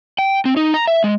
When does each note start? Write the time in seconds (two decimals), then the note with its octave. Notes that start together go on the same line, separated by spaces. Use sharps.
0.19 G5
0.45 C4
0.57 D#4
0.74 A#5
0.87 E5
1.04 G#3